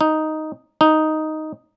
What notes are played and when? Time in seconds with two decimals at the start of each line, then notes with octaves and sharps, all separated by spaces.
0.01 D#4
0.81 D#4